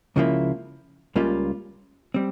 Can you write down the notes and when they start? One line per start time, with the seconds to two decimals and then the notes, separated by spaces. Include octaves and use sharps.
0.16 C#2 C#3 F3 A#3 E4
1.16 C#2 C#3 G3 A#3 F4
2.14 G3 C4